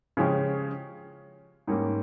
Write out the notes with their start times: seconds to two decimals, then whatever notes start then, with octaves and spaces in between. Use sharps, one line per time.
0.17 C#3 F3 G#3 C#4 G4
1.67 G#2 G3 A#3 C#4